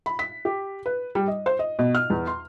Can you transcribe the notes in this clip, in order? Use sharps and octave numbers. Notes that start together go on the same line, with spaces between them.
B5
B6
G4
B4
G3
D#5
C5
D#5
B2
F6
E2
C6